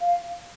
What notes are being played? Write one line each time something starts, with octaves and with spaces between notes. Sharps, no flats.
F5